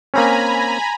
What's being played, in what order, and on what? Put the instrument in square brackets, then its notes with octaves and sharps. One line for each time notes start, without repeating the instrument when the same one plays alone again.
[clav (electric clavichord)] A#3 C4 C#4 [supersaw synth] G#5 A#5 B5